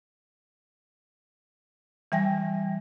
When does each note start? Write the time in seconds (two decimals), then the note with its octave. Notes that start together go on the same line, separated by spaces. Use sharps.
2.12 E3 G3 E5 G5 G#5 A#6